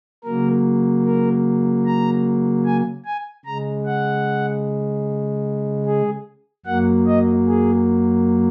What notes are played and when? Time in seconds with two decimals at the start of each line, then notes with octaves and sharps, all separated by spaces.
0.24 C#3 F#3 A#3 A#4
1.05 A#4
1.86 A#5
2.65 G#5
3.05 G#5
3.45 C#3 G#3 A#5
3.85 F#5
5.86 G#4
6.66 F#2 F#3 A#3 F#5
7.06 D#5
7.47 G#4